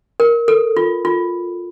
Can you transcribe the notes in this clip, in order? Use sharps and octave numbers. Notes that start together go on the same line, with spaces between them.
A#4
A4
F4
F4